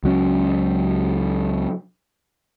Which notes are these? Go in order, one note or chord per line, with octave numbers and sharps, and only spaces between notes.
C#2 F#3 C#4